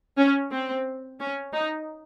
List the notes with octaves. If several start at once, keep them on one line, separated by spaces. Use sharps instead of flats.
C#4
C4
C#4
D#4